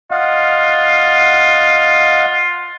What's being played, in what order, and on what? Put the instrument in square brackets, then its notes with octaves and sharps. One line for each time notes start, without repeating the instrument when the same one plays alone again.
[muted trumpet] F4 [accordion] D#5 F5 F#5